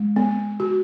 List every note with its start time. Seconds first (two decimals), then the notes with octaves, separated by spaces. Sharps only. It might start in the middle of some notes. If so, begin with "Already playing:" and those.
Already playing: G#3
0.16 B3
0.60 F#4